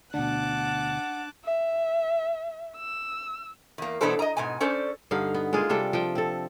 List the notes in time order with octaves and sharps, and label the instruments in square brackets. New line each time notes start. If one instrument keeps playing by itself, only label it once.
[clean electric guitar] D2 B2 [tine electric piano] D4 [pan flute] F#5 [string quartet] A5 D6 F#6
[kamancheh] E5
E6
[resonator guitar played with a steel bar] E2 A#3
B2 E3 B3 D4 A4 C5
D#5 A#5
G#2 B2 G#5
C#4 A4 C5 D5
[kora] G2 D3 D#4 F5
B3
G#3 A#3 F4 G#4
C3 G3 D4 A4
F3 G5
C4 A4